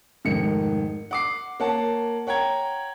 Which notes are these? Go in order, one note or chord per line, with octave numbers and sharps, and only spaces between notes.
F1 G#2 D#3 C#7
F#5 D6 C7
A#3 C#5 F#5 A5
C#5 F#5 G5 A#5 G#6